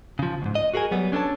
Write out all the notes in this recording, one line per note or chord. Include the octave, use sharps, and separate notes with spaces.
C#3 F3
D2 G#2
D#5
F#4 G#4 A#4 G#5
F#3 G3 B3
C#4 D4 A4 C5 C#5 A5